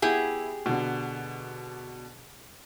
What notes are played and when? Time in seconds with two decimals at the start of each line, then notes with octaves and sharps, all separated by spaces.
0.02 B3 E4 G4 G#4
0.66 B2 D3